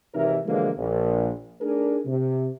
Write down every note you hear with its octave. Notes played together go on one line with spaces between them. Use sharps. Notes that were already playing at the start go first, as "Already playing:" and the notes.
G#1 C3 E3 D#4 A#4 E5
B2 D3 E3 F3 G#3 A#3
A#1
A3 D4 D#4 G#4 A#4
C3